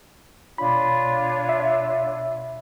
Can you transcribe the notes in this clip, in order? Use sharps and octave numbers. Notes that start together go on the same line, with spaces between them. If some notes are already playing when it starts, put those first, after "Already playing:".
B2 D4 F4 C#5 B5
E5